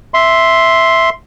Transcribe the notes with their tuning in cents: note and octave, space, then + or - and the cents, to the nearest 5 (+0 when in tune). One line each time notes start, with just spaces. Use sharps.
E5 +0 C6 +0